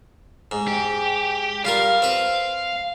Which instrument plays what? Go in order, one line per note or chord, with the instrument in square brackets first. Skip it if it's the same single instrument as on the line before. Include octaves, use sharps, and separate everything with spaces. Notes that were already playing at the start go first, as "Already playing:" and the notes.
[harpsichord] G#2
[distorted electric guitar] G4
[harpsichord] G3 F4 A#4 [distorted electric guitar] F5
[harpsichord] C4 B4